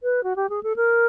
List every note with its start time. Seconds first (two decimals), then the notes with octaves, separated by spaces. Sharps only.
0.03 B4
0.24 F#4
0.36 G4
0.49 G#4
0.63 A4
0.76 A#4